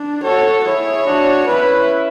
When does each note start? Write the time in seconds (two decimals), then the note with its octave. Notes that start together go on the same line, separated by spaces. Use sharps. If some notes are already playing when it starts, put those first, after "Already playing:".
Already playing: D4
0.23 F#4 A4 C#5
0.64 E4 G#4 C#5
1.05 D4 F#4
1.46 C#4 E4 B4